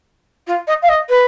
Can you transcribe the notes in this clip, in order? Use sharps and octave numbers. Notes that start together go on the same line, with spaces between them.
F4
D#5
F5
D#5
B4